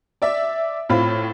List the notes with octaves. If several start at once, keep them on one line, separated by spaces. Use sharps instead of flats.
D5 E5
A2 C4 F4 B5